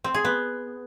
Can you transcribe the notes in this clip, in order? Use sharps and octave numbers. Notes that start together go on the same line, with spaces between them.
C4
G#4
B3